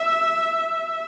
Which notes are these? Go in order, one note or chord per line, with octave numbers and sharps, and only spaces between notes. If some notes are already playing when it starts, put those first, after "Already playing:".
Already playing: E5